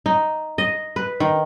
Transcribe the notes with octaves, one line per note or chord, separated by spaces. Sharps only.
D#4
D#5
B4
D#3